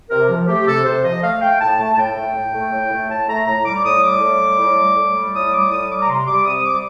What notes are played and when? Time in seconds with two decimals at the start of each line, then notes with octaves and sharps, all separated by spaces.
0.10 C3 A#4
0.29 F3
0.47 A3 G4
0.65 C3 A4
0.84 C3 C5
1.03 F3 D#5
1.22 A3 F5
1.41 A3 G5
1.60 A2 A5
1.78 A3 A5
1.93 A5
1.97 A2 G5
2.15 A3
2.34 A2
2.53 A3
2.71 A2
2.90 A3
3.09 A2 A5
3.28 A3 A#5
3.46 A2 A#5
3.65 G3 D6
3.84 A2 D#6
4.02 G3 D6
4.21 A2
4.40 G3
4.58 A2
4.77 G3
4.96 A2
5.14 G3
5.34 A2 D#6
5.51 G3 D6
5.71 A2 D#6
5.89 G3 D6
6.01 A#5
6.08 C3 C6
6.26 G3 D6
6.45 C3 D#6
6.64 G3 D6